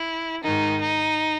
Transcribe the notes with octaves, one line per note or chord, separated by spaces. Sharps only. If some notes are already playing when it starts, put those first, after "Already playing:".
Already playing: E4
G#2 D#3 D#4
D#4